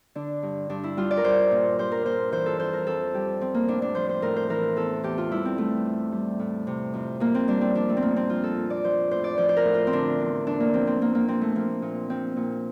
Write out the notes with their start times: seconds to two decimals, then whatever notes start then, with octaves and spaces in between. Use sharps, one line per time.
0.15 D3 D4
0.43 G2
0.69 G2 D4
0.84 E4
0.97 G3 F4
1.11 D5
1.17 A#4
1.24 G3 C5
1.51 A#2
1.79 G3 C5
1.92 A#4
2.05 A#2 C5
2.32 E3 C5
2.46 A4
2.60 F2 C5
2.73 A#4
2.87 F2 A4
3.14 G3 G4
3.40 F3 C4
3.54 A#3
3.68 A2 D4
3.82 D4
3.95 F3 C5
4.09 C5
4.22 A2 A#4
4.36 C5
4.50 E3 A#4
4.76 E2 A4
5.03 E2 G4
5.18 F4
5.31 G3 E4
5.45 C4
5.58 G3 A3
5.85 A2
6.12 G3
6.39 A2
6.67 C3
6.93 F2
7.20 F2 A#3
7.34 C4
7.48 G3 D4
7.61 C4
7.75 F3 D4
7.89 A3
7.97 C4
8.02 A#2 A#3
8.16 C4
8.29 F3 F4
8.43 A4
8.57 A#2
8.70 D5
8.84 F3 C5
9.11 A2 C5
9.24 D5
9.38 F3 C5
9.49 C5
9.57 A#4
9.65 A2
9.74 F4
9.87 C4
9.92 D3 D4
10.20 E2
10.47 E2 D4
10.60 A#3
10.74 F3 C4
10.87 C4
11.01 F3 A#3
11.15 A#3
11.28 A#2 C4
11.41 A3
11.55 F3 A#3
11.82 A#2
12.09 F3 C4
12.37 A#2